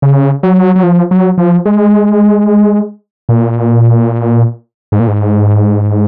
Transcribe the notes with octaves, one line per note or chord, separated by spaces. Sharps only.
C#3
F#3
F#3
F3
F#3
F3
G#3
A#2
G#2
A#2
G#2